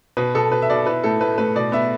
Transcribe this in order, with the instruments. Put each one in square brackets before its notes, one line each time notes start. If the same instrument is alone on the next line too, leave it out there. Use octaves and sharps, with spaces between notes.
[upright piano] B2 B4
B2 A4
B2 B4
E5
B2 D5
E4 B4
A2 A4
A3 B4
A2 B4
B2 D5
B3 E5